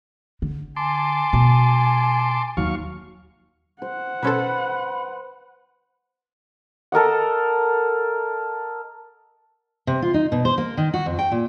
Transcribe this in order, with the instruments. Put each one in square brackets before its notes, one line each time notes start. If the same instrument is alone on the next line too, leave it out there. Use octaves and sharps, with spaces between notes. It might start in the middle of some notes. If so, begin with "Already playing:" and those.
[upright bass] D3
[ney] G#5 [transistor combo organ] A5 C6 D6
[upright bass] B2 G#3
[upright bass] D#2 [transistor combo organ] F#3 F5 C#6
[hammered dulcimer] C5 [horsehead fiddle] F#5
[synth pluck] B2 C#4 A4 [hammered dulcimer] B4 C5 [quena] B5
[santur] A4 A#4 D#5 F#5
[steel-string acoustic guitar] C3
F4
D#4
B2
C5
A#3
D#3
F#4
F2
G5
A#2